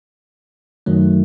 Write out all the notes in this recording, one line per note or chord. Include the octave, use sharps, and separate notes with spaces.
F#2 D#3 F#3 A3